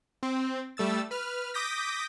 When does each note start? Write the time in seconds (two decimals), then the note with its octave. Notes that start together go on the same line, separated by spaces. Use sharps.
0.23 C4
0.77 G3 A3 E6 A6
1.11 B4 F6
1.54 D6 D#6 G6 A#6 B6